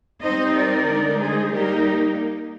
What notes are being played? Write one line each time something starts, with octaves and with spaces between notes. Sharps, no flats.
G3 C4 D#4 C5 D#5
A#4 D5
D3 G#3 D#4
G#4 C5
G3 A#3 D#4 G4 A#4